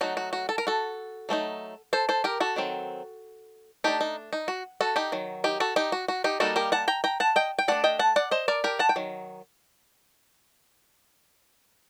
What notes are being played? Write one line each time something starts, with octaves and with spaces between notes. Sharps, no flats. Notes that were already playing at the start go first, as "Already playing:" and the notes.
F#3 A3 D#4 F#4
F#4
F#4
A4
A#4
F#4 A4
F#3 A3 C4 D#4
A4 C5
A4 C5
G4 A#4
F#4 A4
D#3 F#3 C4
A3 D4 D#4 G4
D#4
D#4
F#4
F#4 A4
D#4 G4
D#3 F#3
D#4 G4
F#4 A4
D#4 G4
F#4
F#4
D#4 G4
G3 A#3 D#4 F#4 A4
G4 A#4
F#5 A5
G5 A#5
G5 A#5
F#5 A5
D#5 G5
G5
A3 D4 D5 F#5
D#5 G5
F#5 A5
D5 F#5
C5 D#5
A#4 D5
G4 A#4
F#5 A5
G5
D#3 F#3